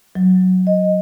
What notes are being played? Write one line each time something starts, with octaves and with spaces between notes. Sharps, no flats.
F#3
D#5